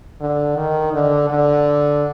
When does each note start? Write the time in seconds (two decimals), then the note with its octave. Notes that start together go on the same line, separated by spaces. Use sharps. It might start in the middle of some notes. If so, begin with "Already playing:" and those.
0.20 D3
0.57 D#3
0.93 D3
1.30 D3